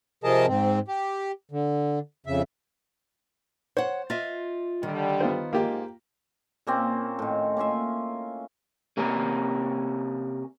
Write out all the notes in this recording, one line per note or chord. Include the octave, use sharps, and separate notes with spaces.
C3 F3 G#4 A#4 D#5 A5
G#2 C4
G4
D3
F2 C#3 E5
C5 C#5 F#5
F4 D#5 E5
D3 D#3 G3
B3 F4 C5
G#2 A#3 F4 G4
A#2 A#3 C4 C#4
A2 D#3
A#3 C#4 F4 E5
C3 A#3 C#4 A#4